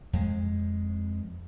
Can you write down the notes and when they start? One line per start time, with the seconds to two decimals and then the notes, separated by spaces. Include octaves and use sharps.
0.13 F2 G#3